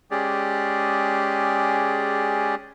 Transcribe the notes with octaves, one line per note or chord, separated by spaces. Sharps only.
G#3 C#4 G4 G#4 D5